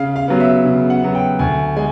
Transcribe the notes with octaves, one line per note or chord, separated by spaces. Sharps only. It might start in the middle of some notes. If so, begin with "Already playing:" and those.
Already playing: C#3 F5
F5
F#3 B3
E5
C#3
F#5
F#3 B3
G5
D2 G#5
G#3 G#5